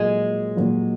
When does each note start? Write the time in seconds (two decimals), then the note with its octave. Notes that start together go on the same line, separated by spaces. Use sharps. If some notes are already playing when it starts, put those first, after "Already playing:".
Already playing: A#2 F#3 G#3 A#3
0.57 A#2 F#3 A#3